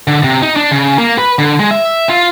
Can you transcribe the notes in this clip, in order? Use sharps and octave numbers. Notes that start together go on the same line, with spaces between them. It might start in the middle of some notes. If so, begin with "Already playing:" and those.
D3
C3
D#4
D4
C#3
A#3
B4
D3
G#3
E5
F4